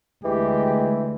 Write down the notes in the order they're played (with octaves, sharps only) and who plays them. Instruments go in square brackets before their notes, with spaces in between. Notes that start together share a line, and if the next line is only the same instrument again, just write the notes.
[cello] D2 [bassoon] E3 [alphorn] G#3 [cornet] G4